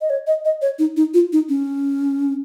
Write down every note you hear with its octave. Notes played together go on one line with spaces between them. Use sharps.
D#5
C#5
D#5
D#5
C#5
D#4
D#4
F4
D#4
C#4